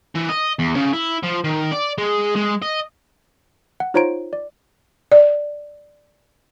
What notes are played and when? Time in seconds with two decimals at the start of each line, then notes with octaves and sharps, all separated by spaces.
0.15 E3
0.29 D#5
0.59 E2
0.76 C#3
0.93 E4
1.23 F3
1.44 D#3
1.71 D5
1.98 G#3
2.36 G#3
2.62 D#5
3.80 F#5
3.94 D#4 F4 C5 C#5 A#5 D7
4.33 D5
5.12 D5